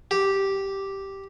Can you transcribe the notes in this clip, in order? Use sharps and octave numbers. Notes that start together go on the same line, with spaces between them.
G4